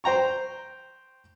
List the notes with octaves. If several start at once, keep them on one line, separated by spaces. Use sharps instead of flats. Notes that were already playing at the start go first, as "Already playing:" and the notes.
C5 G5 A#5 C#6